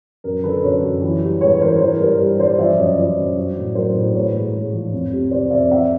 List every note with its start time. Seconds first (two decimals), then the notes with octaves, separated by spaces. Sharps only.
0.24 F#2 A#4
0.44 D3 A4 B4
0.64 F#2 B4 C#5
0.83 F#2
1.02 E3
1.22 G3
1.41 G#2 B4 C#5
1.61 E3 A#4 C5
1.80 E3 A#4 C5
2.00 G2 A#4 C5
2.20 G3
2.39 G2 C5 D5
2.58 F3 D5 E5
2.78 F#2 C#5 D#5
2.98 F3 C5 D5
3.17 F#2
3.36 F#3
3.57 A2
3.75 F#3 A#4 C5
3.95 A2
4.15 G#2 B4 C#5
4.34 G#2
4.54 G#2
4.73 F3
4.93 F2
5.12 C3
5.31 C3 C5 D5
5.51 F2 D5 E5
5.71 F2 E5 F#5